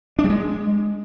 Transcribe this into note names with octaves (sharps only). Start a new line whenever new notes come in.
D4
G3
G#3